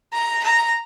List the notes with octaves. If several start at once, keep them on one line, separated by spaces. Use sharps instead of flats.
A#5
A#5